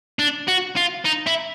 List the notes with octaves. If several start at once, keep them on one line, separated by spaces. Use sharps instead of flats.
D4
F#4
F4
D#4
E4